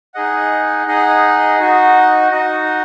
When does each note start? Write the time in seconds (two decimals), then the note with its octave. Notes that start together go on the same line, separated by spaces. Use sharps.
0.14 D#4 G#4 D#5 F#5
0.86 D#4 G#4 D#5 F#5
1.59 D#4 F#4 D#5 F#5
2.31 D#4 F#4 D#5 F#5